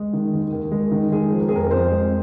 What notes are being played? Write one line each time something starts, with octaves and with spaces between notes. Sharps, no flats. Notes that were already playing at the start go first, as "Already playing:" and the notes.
Already playing: G#3
D#3
D#2
D#2
G#3
D#3
G#3 G#4
F3
A#4
G#4
F2 A#4
F2 C5
G#3